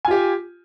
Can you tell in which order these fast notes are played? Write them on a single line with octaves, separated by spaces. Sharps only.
G#5 F4 G4